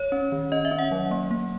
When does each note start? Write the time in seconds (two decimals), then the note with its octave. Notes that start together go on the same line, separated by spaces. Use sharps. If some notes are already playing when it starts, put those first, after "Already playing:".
Already playing: C#5
0.12 C#4
0.32 D#3
0.52 C#4 D#5
0.65 E5
0.71 C#4
0.79 F#5
0.91 F#3
1.11 A#3
1.31 A#3